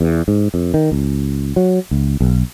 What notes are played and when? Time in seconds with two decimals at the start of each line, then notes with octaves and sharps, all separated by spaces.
0.01 E2
0.28 G#2
0.54 F2
0.74 D#3
0.92 C#2
1.56 F#3
1.91 C#2
2.21 B1